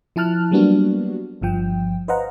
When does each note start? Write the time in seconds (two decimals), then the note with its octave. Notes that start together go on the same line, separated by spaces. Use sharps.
0.16 F3 E4 A5 F6 F#6
0.51 F#3 G3 A#3 B3 D4 F#4
1.42 G1 G2 F3 G5
2.08 B4 C5 D#5 F5 F#5 A#5